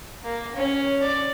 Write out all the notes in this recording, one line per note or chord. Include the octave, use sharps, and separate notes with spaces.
A#3
C#4
D5